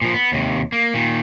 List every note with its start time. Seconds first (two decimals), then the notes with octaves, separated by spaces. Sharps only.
0.02 A#2 F3
0.14 B3
0.32 D#2 C3
0.72 A#3
0.94 A#2 D#3